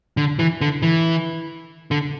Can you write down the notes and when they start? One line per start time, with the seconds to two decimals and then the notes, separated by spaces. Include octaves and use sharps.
0.17 D3
0.39 E3
0.61 D3
0.82 E3
1.91 D3